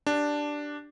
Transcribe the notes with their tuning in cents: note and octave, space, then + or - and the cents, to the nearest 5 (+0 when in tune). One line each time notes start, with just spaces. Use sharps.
D4 +0 G4 +0